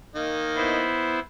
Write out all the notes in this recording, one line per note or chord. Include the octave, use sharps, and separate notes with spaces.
D#3 A#3 D#5
B3 E4 C5